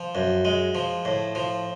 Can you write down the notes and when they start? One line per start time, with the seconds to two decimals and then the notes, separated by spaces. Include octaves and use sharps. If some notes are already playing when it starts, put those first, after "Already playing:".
Already playing: F3
0.15 F#2
0.45 G#3
0.75 F3
1.05 A2
1.35 F3